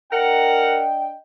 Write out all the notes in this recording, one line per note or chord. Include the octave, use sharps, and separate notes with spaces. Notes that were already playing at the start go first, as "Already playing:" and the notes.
D4 A#4 D#5 F#5 G5